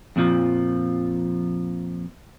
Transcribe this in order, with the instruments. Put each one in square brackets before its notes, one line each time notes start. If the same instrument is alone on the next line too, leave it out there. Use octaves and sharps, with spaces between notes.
[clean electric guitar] F2 A#2 D3 F3